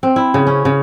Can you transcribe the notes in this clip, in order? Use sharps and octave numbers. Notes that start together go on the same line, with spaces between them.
C4
E4
C#3
C#4
C#3